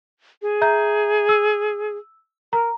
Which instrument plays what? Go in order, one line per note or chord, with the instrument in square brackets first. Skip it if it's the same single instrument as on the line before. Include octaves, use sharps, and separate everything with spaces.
[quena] G#4
[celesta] E5 A#5 G6
E6
[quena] A#4 [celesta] A#5